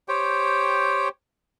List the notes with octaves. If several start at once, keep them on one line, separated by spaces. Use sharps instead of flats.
G4 C5 C#5 G5